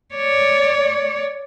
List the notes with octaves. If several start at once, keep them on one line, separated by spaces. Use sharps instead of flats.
C#5 D5